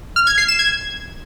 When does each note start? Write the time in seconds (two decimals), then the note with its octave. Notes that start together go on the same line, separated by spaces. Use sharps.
0.16 F6
0.27 G#6
0.38 C7
0.48 E7
0.59 G#6